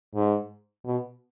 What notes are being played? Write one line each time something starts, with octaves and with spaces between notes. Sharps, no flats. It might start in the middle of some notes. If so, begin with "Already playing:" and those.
G#2
B2